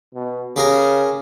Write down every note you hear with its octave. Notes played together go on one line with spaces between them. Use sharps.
B2
C#3 G4 G#4 A#4